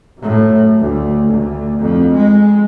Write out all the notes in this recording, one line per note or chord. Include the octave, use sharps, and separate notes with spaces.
F#2 A2
D2
D2
F2
G#3